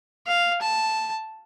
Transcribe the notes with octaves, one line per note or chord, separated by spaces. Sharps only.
F5
A5